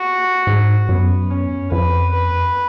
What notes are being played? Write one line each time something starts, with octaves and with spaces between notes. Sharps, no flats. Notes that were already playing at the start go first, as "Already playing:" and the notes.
Already playing: F#4
G#2
F#2 B3
C#4
F2 B4
B4